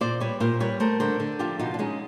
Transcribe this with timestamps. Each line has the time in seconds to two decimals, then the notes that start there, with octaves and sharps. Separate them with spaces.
0.01 A#2 C5 D5
0.20 G3 B4 C#5
0.40 A#2 A#4 C5
0.60 G3 B4 C#5
0.80 A3 A#4 C5
1.00 D3 A#4 C5
1.20 D3
1.39 F3 F4 G4
1.59 B2 D#4 F4
1.74 D4
1.79 G#3 C#4 D#4